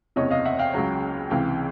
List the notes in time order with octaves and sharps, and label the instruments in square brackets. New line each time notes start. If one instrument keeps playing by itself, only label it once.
[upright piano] F#1 E2 C3 C#5 D#5
D#5 F5
E5 F#5
F5 G5
C#2 C#3 F#3
C#2 C3 E3 F5 G5